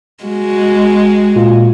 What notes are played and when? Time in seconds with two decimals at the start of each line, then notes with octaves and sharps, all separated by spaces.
0.24 G#3 F#4
1.36 A#2 F4